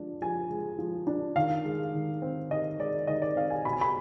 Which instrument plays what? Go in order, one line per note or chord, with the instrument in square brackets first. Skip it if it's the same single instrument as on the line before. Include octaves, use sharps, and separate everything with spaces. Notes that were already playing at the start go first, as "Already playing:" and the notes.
Already playing: [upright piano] F3 G#3 D4
F3 G#5
G#3
F3
D4
D#3 F5
G#3
D#3
C4
D#3 D#5
G#3 D5
D#3 D#5
D5
C4 F5
G#5
B2 B5
G#5
B5